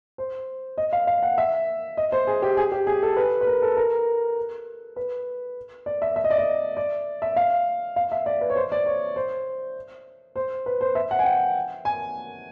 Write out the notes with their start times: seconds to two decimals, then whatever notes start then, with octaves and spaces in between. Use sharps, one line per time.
0.18 C5
0.78 D#5
0.93 F5
1.07 F5
1.23 F#5
1.38 E5
1.97 D#5
2.12 C5
2.27 G#4
2.42 G4
2.57 G#4
2.72 G4
2.87 G#4
3.03 A4
3.17 B4
3.41 B4
3.47 A#4
3.62 A4
3.77 A#4
4.96 B4
5.86 D5
6.02 E5
6.16 E5
6.24 D#5
6.31 D5
6.38 D#5
6.77 D5
7.22 E5
7.36 F5
7.96 F5
8.12 E5
8.26 D5
8.41 B4
8.50 C#5
8.56 C5
8.72 D5
8.86 C#5
9.16 C5
10.36 C5
10.66 B4
10.81 C5
10.95 E5
11.11 F#5
11.19 G#5
11.25 G5
11.85 G#5